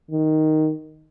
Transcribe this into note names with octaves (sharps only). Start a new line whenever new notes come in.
D#3